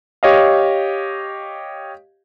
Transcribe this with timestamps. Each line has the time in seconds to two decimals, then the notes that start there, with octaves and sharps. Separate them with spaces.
0.23 G4 C#5 D#5 F5